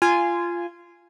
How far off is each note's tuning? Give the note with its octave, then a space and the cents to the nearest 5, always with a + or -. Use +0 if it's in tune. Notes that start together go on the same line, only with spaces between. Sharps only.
F4 -15 G#5 +0